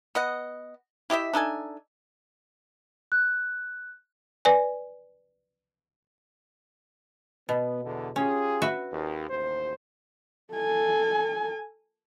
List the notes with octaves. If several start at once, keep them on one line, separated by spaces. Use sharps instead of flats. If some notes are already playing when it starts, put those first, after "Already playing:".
B3 D#5 F#5
E4 G4 D#5 E5
D4 D#4 A4 G#5
F#6
B4 D5 G#5
B2 B3
E2 D3
C#4 F4 G4 G#4
F#4 B4 E5
D#2
A1 D#2 C5
A4 G#5